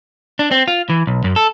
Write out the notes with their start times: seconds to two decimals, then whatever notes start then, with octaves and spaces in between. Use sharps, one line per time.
0.39 D4
0.51 C4
0.68 F4
0.90 E3
1.07 B1
1.24 F#2
1.36 A4